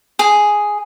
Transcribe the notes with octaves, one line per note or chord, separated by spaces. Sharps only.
G#4